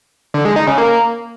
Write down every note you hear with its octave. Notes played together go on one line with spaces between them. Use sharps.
D3
G#3
D#4
C#3
A#3